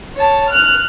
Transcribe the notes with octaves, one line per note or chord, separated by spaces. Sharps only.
C#5 A5
F6 F#6